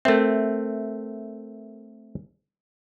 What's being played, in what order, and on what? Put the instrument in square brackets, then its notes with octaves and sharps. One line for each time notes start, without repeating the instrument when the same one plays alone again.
[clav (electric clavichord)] A3 C4 [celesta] A4 A#4 E5